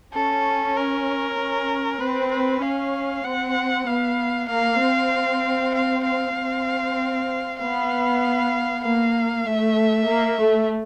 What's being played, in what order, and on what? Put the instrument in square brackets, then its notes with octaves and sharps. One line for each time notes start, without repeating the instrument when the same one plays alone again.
[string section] C#4 [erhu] A4
[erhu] A#4
[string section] C#4
[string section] C4 [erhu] B4
[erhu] B4
[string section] C#4 [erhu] F5
[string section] C4 [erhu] F#5
[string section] B3 [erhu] F5
[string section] A#3 [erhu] F5
[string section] C4
[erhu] F5
F5
[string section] C4
[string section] B3 [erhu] F5
[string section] A#3 [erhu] F5
[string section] A3 [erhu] E5
[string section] A#3
A3